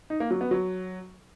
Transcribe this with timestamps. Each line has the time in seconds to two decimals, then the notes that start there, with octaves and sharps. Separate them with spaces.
0.10 D#4
0.20 A#3
0.31 F#3
0.41 B3
0.51 F#3